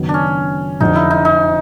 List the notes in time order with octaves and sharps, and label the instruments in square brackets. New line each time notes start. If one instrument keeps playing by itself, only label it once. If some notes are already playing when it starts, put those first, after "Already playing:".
Already playing: [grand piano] F#1 F#2 D#3 F#3 B3
[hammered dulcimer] D4
C#4
[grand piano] F1 F2 D3 [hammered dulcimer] D#4
[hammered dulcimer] E4
D#4
D#4